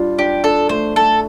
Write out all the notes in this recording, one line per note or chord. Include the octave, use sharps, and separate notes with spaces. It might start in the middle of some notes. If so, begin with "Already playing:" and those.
Already playing: G3 D4 F4
D4 G4
D4 A4
A3 C5
A3 A4